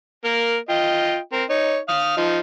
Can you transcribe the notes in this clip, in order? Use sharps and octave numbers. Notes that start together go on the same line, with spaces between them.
A#3 A#4
F4 D#5 G5
C4 A#4
D#4 C#5
F5 D#6 F6
F3 D#4